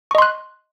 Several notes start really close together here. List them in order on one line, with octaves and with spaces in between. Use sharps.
C#6 D#5 C6 F#6